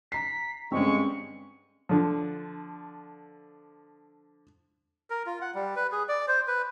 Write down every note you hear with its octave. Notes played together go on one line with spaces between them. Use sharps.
A#5 B6 C7
G2 D3 G#3 C4 C#4 C#6
D3 F3
A#4
F4
F#5
G3
B4
G#4
D5
C5
B4